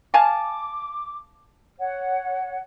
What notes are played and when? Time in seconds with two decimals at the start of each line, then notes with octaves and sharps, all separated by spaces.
0.14 F5 G#5 A5 D6
1.79 C#5 F#5